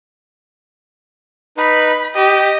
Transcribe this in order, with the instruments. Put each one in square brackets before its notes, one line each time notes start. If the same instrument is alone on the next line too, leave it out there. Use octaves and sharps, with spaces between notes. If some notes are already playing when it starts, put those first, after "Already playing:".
[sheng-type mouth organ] D#4 B4 [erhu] B5
[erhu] G4 [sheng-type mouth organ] D#5 D#6